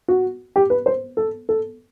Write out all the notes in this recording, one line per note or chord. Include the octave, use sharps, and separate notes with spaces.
F#4
G4
B4
C5
A4
A4